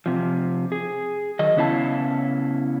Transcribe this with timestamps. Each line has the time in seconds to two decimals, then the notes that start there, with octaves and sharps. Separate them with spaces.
0.06 C3 F3
0.72 G#4
1.39 D#3 F#3 D#5
1.56 C#3 B3 C#4 E4 F5 A5